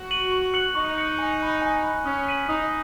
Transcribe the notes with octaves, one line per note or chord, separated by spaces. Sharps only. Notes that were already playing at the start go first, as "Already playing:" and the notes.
Already playing: F#4
D#7 F#7
C#6
F#6 C#7 F#7
D#4 C#6
F#6 C#7 F#7
G#5
B5 F#6
G#5
B5 F#6
C#4 D#6
B6 D#7 F#7
D#4 D#6